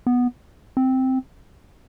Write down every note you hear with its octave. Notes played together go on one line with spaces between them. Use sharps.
B3
C4